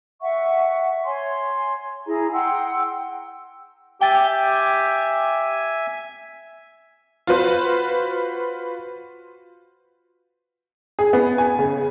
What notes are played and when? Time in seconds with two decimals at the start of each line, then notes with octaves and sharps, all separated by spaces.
0.21 E5 F#5 C#6
1.05 C#5 G#5 C6
2.07 E4 G#4 A#5
2.33 F#5 G5 C6 E6
4.01 G4 E5 G5 G#5 A6
7.27 F4 F#4 B4 C5
10.99 G#4
11.13 B3
11.38 G#5
11.59 C#3